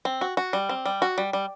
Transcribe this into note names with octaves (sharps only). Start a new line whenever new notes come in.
C4
F#4
F#4
G3
C4
G3
F#4
G3
G3